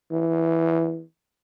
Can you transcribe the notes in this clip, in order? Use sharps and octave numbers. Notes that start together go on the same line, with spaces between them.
E3